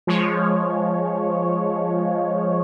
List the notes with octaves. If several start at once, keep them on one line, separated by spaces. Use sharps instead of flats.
F3 G#3 C#5